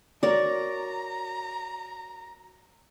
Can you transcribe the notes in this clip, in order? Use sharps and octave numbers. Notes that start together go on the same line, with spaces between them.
F#4 A#4 C#5 D5 A#5